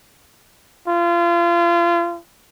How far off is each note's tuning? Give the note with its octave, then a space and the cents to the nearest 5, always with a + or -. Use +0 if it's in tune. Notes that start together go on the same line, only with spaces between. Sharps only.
F4 -30